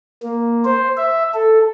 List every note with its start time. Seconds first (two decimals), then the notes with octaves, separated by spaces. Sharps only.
0.23 A#3
0.65 C5
0.97 E5
1.34 A4